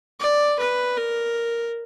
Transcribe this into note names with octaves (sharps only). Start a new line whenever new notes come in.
D5
B4
A#4